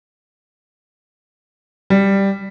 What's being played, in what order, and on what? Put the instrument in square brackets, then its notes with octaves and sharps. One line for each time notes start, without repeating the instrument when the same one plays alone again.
[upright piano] G3